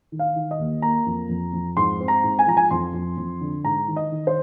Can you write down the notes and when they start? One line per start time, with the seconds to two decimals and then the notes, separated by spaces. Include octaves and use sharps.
0.12 D#3
0.19 F5
0.36 D#3
0.51 D#5
0.59 D#2
0.82 A#3 A#5
1.06 F2
1.29 F2
1.53 F2
1.77 G#2 C6
2.00 C4
2.08 A#5
2.24 G#2
2.39 G#5
2.47 F3 A#5
2.57 G#5
2.71 F2 C6
2.94 F2
3.17 F2
3.41 D3
3.65 G#2 A#5
3.88 D#3
3.96 D#5
4.12 D#3
4.27 C5